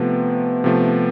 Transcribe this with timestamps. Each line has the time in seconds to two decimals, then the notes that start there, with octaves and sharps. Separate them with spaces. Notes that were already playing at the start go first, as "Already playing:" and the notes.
Already playing: C3 F3 A3 B3
0.64 C3 F3 A3